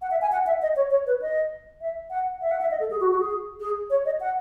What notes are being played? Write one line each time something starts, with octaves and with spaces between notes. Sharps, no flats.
F#5
E5
G#5
F#5
E5
D#5
C#5
C#5
B4
D#5
E5
F#5
E5
F#5
E5
D#5
A4
G#4
F#4
F#4
G#4
G#4
C#5
D#5
F#5